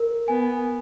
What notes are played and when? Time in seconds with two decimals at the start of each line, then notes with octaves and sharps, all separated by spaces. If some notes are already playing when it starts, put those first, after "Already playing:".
Already playing: A#4
0.28 B3 G#5